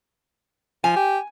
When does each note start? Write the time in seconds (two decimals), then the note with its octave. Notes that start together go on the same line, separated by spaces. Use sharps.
0.84 F3 G#5
0.96 G4